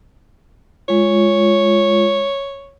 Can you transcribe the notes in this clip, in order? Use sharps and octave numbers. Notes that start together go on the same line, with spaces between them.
G#3 F4 C#5